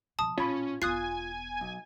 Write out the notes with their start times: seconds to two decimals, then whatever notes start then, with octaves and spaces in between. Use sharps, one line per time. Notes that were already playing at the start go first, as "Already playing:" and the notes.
0.19 B2 F3 A5 D#6
0.38 A1 A#2 C#4 F4 B5
0.82 E1 B3 F4 G#5 D#6 F#6 C7
1.61 B1